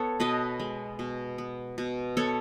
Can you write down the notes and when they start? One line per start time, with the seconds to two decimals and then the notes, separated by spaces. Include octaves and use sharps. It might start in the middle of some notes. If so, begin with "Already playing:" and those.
Already playing: B3 A4 C#5
0.20 B2 B4 D#5
0.60 G#3
0.99 B2
1.38 B3
1.78 B2
2.17 B3 A4 C#5